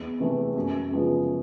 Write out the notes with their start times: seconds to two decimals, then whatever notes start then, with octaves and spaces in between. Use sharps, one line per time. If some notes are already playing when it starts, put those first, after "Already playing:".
Already playing: E2
0.20 C3 E3 A3
0.56 F#2
0.91 C#3 F3 G#3 B3